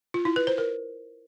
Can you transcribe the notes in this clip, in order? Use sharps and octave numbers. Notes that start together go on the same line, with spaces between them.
F4
E4
B4
C5
A#4